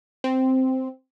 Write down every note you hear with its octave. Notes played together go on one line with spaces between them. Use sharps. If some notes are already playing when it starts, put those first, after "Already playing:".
C4